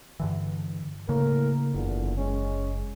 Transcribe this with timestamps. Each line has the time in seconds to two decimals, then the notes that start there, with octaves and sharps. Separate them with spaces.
0.20 G2 D3 E3
1.09 A2 C#3 A#3 A#4
1.74 F#1 E2 A#2 D3
2.17 G#3 C#4